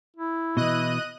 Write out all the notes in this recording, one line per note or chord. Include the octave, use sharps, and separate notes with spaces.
E4
B2 E3 D#5 F#6 D#7